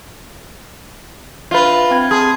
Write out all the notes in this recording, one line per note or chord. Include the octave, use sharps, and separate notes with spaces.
D4 F4 B4 E5
C4 G5 G#6
G#4 A5 C6 G#6